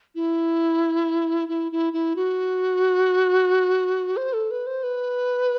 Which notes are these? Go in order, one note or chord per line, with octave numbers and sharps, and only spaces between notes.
E4
E4
E4
E4
F#4
C5
A4
B4
C5
B4